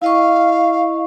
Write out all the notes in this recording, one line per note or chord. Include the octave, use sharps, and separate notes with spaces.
E4 D#5 F5 C#6